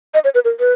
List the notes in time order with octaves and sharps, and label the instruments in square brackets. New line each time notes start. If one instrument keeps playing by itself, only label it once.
[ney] D#5
C#5
B4
A#4
B4